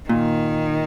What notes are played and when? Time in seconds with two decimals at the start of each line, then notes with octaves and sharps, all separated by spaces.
0.09 A#2 D#3